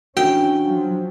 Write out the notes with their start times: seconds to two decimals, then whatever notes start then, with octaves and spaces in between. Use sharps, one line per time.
0.17 E3 C#4 D4 F#4 G5
0.63 F3 F#3